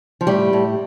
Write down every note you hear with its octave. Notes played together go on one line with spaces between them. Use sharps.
F3
A2 G3
A2